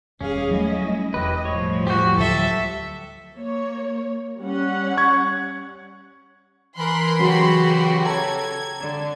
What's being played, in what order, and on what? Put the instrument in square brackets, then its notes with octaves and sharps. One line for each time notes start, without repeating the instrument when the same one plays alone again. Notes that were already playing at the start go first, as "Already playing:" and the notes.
[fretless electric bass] D#1 [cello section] G3 G#4 F5 [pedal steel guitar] C#4
[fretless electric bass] F#3 G3 [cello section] A3 E4 D#5
[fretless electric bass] E1 [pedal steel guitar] E4 G4 B4 [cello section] D#5
[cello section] A2 F3 G3 [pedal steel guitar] C#5
[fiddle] F#4 [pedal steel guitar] G4 G6
[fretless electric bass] D2 F#3 [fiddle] A4 E5
[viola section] A#3 C#5
G3 C#4 F#5
[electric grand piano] C#6 G#6
[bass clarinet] E3 [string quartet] A#4 F#6 [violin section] B5 C6
[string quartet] C#3 F#4 G4 [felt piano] F#3
[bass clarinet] A4 [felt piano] C#5 A5 A#5 [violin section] G#6
[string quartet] D3